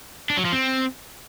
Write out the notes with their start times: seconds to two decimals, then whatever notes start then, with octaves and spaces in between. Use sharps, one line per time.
0.30 D4
0.37 F#3
0.45 F3
0.53 C4